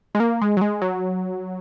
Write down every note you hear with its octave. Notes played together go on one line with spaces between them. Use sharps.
G#3
A#3
G#3
F#3
G#3
F#3